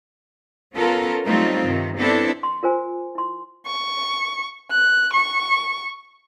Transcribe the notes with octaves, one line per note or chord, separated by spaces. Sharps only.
B3 C#4 F4 A4 A#4
F#3 G3 A3 C4 D#4 F4
G2 C3 D#3
B3 C4 D4 E4 A4
C6
F4 A#4 C5 G#5
E4 C6
C#6
F#6
C#6